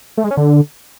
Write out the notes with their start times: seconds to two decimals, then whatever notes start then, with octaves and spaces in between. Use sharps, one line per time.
0.18 A3
0.24 G#3
0.31 C#4
0.37 D3